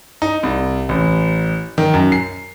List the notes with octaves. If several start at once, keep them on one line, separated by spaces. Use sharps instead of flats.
D#4
C2
A1
D#3
F#2
C7